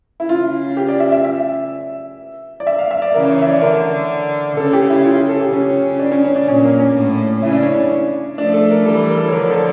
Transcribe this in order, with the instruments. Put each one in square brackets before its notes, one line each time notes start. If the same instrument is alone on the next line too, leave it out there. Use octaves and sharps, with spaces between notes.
[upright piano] E4
[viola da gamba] C#3 [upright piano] F4
[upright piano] G4
D5
E5
E5
E5
D5
E5
F5
E5
D5
[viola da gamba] C#3 E3 [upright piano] A#4
[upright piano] C#5
E5
D5
[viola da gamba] D3 [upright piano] A#4
[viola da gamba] C#3 [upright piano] A4
[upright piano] G4
E4
F4
G4
A4
G4
[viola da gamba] C#3 [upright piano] C#4
[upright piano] D4
C#4
C#4
D4
[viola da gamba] A#2 [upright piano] C#4
[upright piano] A#3
C#4
[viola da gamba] A2
[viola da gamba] C#3 [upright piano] E4
[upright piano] D4
C#4
D4
[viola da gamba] F3 A3 [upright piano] D4
[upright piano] A4
A#4
[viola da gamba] E3 G3 [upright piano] A4
[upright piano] A#4
A4
C#5
[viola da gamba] D3 F3 [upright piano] A#4
[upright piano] A4